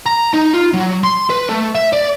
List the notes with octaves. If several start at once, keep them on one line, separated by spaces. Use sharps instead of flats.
A#5
D#4
F4
F#3
C6
B4
A3
E5
D5